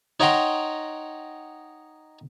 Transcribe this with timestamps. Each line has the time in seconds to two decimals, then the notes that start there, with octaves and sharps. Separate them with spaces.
0.20 D#4 C#5 F#5 G5 A#5 C6